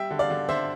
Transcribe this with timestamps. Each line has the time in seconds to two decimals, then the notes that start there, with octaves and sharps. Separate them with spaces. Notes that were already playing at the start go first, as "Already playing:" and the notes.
Already playing: G3 E5 G5
0.11 D3
0.19 D5 F5
0.30 D3
0.49 D3 C5 E5